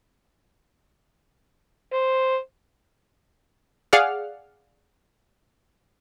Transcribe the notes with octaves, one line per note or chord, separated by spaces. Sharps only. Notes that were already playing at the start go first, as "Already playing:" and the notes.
C5
G#4 D5 F5 F#5 F6